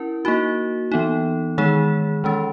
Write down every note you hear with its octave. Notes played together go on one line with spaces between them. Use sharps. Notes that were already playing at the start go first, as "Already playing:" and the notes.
Already playing: C#4 E4 A#4
A#3 D#4 F#4
E3 B3 D#4
D#3 G#3 D#4 G#4
E3 G#3 C#4